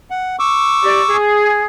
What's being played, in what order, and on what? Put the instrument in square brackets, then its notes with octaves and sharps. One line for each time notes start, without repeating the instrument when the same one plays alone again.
[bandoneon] F#5
C#6 D6 E6
[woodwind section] G4 D5
G#4